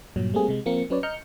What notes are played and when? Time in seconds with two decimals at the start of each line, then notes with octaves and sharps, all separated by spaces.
0.16 G2 A#2 F#3
0.34 G3 A3 A#3 C4 G#4
0.48 C3 G#3
0.66 F3 A#3 C4 A#4 C#7
0.90 F#3 C#4 B4 C#5 D5
1.03 D#5 A#5 F6 G6 C#7